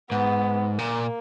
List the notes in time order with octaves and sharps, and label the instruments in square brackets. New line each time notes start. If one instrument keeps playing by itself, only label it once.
[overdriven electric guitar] G#2 [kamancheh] B3
[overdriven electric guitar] A#2 [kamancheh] A#3